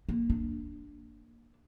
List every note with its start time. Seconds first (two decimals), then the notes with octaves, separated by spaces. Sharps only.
0.09 A#3
0.30 D4